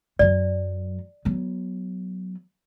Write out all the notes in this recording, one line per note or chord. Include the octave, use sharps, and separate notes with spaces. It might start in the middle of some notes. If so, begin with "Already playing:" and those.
F#2 F#3 D5
F#3 B3